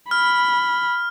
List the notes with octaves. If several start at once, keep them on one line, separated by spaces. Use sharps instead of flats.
B5 F6